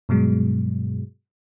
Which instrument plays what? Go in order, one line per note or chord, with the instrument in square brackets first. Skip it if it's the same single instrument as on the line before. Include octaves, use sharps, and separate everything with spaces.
[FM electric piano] G2 B2 F#3 G#3